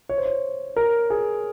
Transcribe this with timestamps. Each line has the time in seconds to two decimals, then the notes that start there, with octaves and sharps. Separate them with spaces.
0.09 C#5
0.18 C5
0.25 C#5
0.76 A#4
1.10 G#4